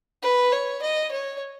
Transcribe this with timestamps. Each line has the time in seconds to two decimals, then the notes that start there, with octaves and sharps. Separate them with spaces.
0.22 B4
0.53 C#5
0.82 D#5
1.12 C#5